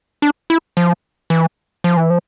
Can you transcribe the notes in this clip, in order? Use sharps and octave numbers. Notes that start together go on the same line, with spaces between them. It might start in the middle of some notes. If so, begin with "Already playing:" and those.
D4
E4
F3
E3
F3
E3
F3